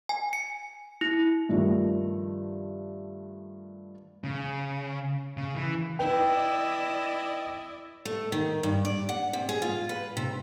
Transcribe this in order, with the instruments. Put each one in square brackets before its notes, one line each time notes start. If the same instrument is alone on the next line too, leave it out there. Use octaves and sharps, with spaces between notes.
[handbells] G#5
C#7
E4
[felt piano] G2 D#3 F3 A3
[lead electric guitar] C#3
C#3
E3
[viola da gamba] E4 [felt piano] B4 [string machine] D5 D#5 [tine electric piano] G5
[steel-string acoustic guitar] A3
D#3
G2
D5
F#5
C3
G#4
F4
B4
C3